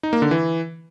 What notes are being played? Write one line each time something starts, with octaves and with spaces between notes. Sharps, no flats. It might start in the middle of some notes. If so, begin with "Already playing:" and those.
D#4
A#3
D3
E3